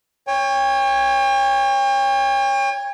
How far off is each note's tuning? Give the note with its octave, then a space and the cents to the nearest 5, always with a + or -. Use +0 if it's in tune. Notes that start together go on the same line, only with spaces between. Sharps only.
C#5 +0 G5 +40